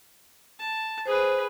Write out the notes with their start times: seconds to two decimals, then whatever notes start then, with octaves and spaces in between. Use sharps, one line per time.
0.59 A5
1.06 G#4 B4 C5